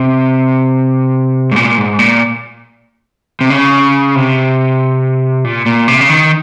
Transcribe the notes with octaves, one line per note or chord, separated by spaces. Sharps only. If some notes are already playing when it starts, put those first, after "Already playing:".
Already playing: C3
G#2
A#2
G#2
A#2
C3
C#3
C3
A#2
A#2
C3
C#3
D#3